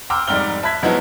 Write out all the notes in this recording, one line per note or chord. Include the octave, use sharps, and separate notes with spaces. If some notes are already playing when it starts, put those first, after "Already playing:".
G5 A#5 C6 D6 E6 F6
F1 G#2 G3 A#5 F6 G7
E5 A5 B5 F#6 G#6 B6
F3 F#3 G#3 B3 D#4 E4